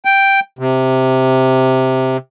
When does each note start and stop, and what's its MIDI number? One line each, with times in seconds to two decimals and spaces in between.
0.05 0.40 79
0.59 2.17 48